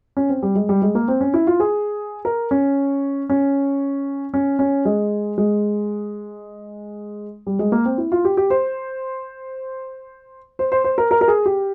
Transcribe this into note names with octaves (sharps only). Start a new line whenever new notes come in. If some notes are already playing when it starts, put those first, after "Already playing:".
C#4
C4
G3
G#3
G3
G#3
A#3
C4
C#4
E4
F4
G#4
A#4
C#4
C#4
C#4
C#4
G#3
G#3
G3
G#3
A#3
C4
E4
F4
G4
G4
C5
C5
C5
C5
A#4
A#4
A#4
G#4
G4